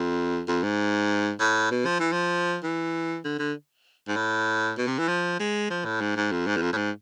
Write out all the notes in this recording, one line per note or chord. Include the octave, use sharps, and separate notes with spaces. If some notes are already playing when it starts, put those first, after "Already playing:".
Already playing: F2
F2
G#2
A2
B2
F3
E3
F3
E3
D3
D3
G#2
A2
B2
C3
E3
F3
G#3
F3
A2
G#2
G#2
F2
G#2
E2
F2
A2
G#2